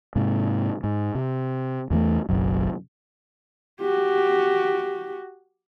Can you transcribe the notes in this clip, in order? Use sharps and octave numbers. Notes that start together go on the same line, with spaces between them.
G#2 C3
G#2
C3
E2 E3 A3
F#1 B1 F#2
F#4 G4